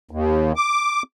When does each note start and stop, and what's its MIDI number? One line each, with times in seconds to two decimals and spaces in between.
0.11 0.52 39
0.56 1.02 86